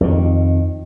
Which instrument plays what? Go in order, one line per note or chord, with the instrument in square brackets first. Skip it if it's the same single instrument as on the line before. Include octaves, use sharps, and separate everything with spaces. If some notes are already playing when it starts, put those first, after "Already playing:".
[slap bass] F2 D#3